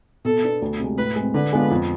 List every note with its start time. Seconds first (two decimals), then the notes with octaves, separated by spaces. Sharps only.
0.25 B2 A4
0.43 B3 D4
0.62 D2
0.79 C3 G#3
0.98 A2 B4
1.16 G#3 C4
1.34 D3 B4
1.53 G#3 B3 D4 F4
1.71 F2